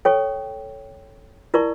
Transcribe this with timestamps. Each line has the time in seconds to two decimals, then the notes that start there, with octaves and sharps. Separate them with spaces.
0.05 A4 C#5 G5 C#6
1.54 E4 A#4 D5 A5 C#6